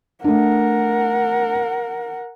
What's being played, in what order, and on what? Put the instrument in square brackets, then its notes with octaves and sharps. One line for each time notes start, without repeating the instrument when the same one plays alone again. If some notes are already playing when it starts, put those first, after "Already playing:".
[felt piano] A3 D4 [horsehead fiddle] A#4 F#5